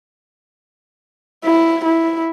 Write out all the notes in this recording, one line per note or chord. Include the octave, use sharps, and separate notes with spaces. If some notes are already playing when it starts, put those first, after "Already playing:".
E4
E4